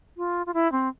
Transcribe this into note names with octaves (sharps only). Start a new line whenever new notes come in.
F4
F4
E4
C4